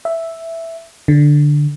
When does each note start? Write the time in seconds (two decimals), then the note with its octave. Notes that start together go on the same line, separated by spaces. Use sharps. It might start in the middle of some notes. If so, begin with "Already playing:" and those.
0.05 E5
1.08 D3